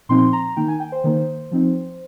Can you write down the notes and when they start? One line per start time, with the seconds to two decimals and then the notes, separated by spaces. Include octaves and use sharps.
0.09 A#2 F3 C4 D#4 C6
0.33 A#5
0.57 D#3 A#3 D#4 G5
0.68 G#5
0.80 G5
0.92 C5
1.04 D#3 A#3 D#4
1.52 F3 C4 D#4